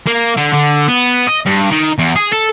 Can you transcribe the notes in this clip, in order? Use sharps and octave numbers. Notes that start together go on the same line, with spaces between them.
A#3
D3
D3
B3
D#5
G2
D#3
E2
G#4
A4